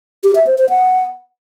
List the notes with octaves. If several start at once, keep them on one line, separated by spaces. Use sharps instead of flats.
G4
E5
C5
C5
F#5